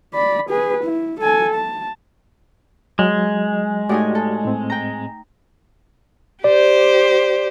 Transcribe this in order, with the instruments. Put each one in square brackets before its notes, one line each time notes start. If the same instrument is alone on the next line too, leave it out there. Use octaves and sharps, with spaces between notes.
[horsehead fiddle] D5 B5
G#4 B4
E4
A4 G#5
A5
[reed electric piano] F#3 [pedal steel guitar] G#3
[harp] A2 D#4 G#5 [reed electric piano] F#4 G4 D5
[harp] A4
[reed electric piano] A2 C4
[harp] G5 A#5
[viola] G4 C5 [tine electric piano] D5